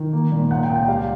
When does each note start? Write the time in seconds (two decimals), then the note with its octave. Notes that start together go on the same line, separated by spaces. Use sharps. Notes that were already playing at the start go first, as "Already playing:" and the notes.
Already playing: D#3
0.13 A#3
0.32 A#2
0.51 C#2 F#5
0.63 G5
0.70 C#2
0.76 G5
0.88 G3 F5